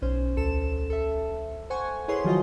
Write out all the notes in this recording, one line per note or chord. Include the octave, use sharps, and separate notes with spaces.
B1 C#4 C5
D2 A4 E7
A4 E5
C5 F#5 G#5 C#6
E4 G#4 B4 C#5 C6
D#3 F3 F#3 F4 F#4 D#5